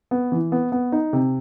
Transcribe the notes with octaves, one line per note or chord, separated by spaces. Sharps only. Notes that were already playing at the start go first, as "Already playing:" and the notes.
B3
E3
B3
B3
D#4
C3